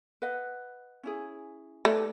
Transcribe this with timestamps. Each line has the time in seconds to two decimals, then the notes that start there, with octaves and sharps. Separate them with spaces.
0.22 B4 D#5 F#5
1.03 C#4 E4 G#4
1.85 A3 D#4 G4 B4 D5